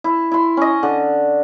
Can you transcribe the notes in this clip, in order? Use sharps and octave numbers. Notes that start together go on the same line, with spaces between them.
E4
E4 C6
C#4 D#5
D3